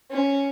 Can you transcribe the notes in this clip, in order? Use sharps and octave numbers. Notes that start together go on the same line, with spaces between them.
C#4